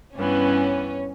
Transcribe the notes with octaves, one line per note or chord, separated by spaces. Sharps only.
G2 E3 B3 C#4